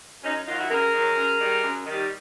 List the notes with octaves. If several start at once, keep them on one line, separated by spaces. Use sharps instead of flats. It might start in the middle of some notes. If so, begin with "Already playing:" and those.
F#2 C#4 D#4
D#3 F#3 D#4 F4
E4 F#4
F#2 G#4 A#4
D#3 F#3
F#2
D#3 G3
F#2
D#3
G3